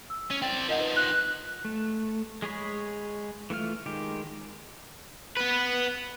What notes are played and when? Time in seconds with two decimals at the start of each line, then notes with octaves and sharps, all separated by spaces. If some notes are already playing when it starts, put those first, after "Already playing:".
0.10 E6
0.31 C#4 D#7
0.42 C4 D5 G5
0.68 F3 D#4 A#4 D#5 F#5
0.80 B4
0.96 F#6
1.65 A3
2.42 G#3 G#4 C#5 B5
3.50 E3 A3 F4 F6
3.86 D#3 G#3 G4
5.37 B3 B4